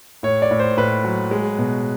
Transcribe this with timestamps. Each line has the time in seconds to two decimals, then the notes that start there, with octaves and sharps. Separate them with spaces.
0.23 A2 C#5
0.42 D5
0.51 A2
0.59 C5
0.77 A2 B4
1.05 F#3
1.31 G#3
1.58 B2